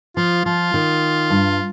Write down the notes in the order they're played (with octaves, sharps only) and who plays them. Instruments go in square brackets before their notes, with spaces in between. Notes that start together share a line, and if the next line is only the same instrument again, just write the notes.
[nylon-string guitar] F3 [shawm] F4
[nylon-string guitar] F3 [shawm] F4
[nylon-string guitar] D#3
G2